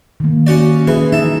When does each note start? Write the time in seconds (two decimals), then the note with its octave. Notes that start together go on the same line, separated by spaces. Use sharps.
0.20 D#3 A#3
0.47 C#4 F#4 D5
0.87 E3 G#4 B4
1.12 D#4 E5 A5